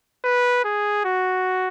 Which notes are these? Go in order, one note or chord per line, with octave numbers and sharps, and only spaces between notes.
B4
G#4
F#4